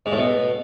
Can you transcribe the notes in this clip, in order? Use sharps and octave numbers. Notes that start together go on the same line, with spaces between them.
G#2
A2
B2